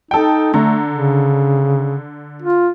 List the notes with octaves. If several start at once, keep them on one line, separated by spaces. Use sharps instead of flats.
D#4 A4 G5
D3 A3 A#5
C#3
F4